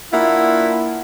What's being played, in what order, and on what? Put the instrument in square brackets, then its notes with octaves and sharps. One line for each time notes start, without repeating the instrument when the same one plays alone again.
[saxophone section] A#3 D4 E4 F4 E5 F#5